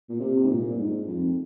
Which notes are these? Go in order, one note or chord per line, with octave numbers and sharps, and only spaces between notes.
A#2
C3
G#2
A#2
G2
G#2
F2